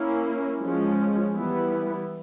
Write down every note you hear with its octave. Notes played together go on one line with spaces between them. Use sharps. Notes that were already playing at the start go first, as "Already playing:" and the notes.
Already playing: A#3 C#4 E4
F3 G#3 C#4
E3 G3 B3 E4